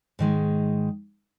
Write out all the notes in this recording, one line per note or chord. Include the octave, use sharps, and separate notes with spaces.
G#2 D#3 G#3